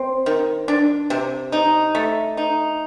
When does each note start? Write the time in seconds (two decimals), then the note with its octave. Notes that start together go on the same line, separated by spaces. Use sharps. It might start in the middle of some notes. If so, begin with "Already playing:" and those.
Already playing: C4
0.26 D#3
0.68 D4
1.10 C3
1.52 D#4
1.95 A3
2.37 D#4